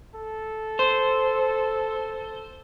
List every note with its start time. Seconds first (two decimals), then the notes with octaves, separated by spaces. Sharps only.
0.15 A4
0.79 C5